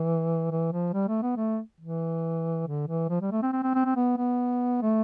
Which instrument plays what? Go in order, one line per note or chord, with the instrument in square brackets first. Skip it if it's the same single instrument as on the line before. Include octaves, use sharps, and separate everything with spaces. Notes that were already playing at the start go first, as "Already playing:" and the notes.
Already playing: [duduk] E3
E3
F3
G3
A3
B3
A3
E3
D3
E3
F3
G3
A3
C4
C4
C4
C4
C4
B3
B3
A3